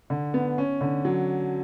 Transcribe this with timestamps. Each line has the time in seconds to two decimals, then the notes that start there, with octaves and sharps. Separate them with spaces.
0.10 D3
0.34 B3
0.58 C#4
0.81 D3
1.05 F#3